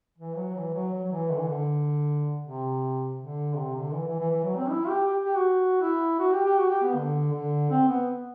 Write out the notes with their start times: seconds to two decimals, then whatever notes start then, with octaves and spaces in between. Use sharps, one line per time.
0.18 E3
0.37 F#3
0.56 E3
0.74 F#3
0.94 F#3
1.04 F#3
1.12 E3
1.31 D3
1.40 E3
1.48 D3
2.43 C3
3.20 D3
3.56 C3
3.76 D3
3.94 E3
4.07 E3
4.19 E3
4.31 E3
4.44 F#3
4.57 C4
4.70 E4
4.88 G4
5.07 G4
5.25 G4
5.35 F#4
5.81 E4
6.19 F#4
6.32 G4
6.45 G4
6.58 F#4
6.70 G4
6.82 B3
6.95 D3
7.33 D3
7.70 C4
7.88 B3